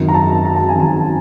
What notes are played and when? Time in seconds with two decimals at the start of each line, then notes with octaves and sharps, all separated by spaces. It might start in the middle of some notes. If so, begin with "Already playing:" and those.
Already playing: G#1 F#2 D#3
0.08 A#5
0.14 A5
0.45 A#5
0.56 A5
0.69 G#5
0.75 G#1 F#2 D#3 A5